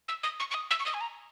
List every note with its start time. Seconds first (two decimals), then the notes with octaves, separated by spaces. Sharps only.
0.08 E6
0.23 D#6
0.40 C#6
0.51 C#6
0.54 D#6
0.71 E6
0.80 C#6
0.86 D#6
0.94 G#5
1.01 A#5